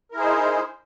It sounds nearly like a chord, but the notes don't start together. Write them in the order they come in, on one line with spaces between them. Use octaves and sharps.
A#4 E4 G#4 C5 D#4